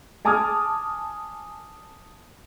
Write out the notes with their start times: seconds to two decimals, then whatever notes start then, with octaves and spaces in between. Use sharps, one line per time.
0.25 G#5 A5 D6 D#6 F6 G#6